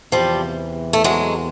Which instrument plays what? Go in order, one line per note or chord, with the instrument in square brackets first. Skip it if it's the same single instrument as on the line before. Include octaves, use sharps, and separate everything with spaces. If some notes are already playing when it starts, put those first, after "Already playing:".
[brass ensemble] E2 C3 E3 [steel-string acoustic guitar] F3 G3
[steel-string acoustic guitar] A3
F#3 G#3